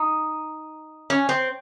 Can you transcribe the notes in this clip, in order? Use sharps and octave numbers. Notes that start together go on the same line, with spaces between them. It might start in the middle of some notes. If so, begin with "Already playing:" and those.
Already playing: D#4
C#4
C4